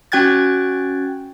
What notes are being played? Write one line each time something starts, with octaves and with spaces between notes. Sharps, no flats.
C#4 F#4 G5 F#6 G#6 A6